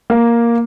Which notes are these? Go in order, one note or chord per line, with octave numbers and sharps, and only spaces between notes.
A#3